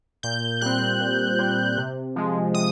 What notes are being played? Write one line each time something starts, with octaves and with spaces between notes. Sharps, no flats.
A#2 G6
G3 C4 F#6
A#2
G3 C4
C3
F3 G#3
C3 D#6